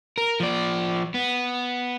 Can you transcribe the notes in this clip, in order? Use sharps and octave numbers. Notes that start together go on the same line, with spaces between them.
A#4
F3 D5
B3